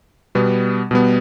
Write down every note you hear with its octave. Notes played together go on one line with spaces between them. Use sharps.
B2 G3 B3
B2 G3 B3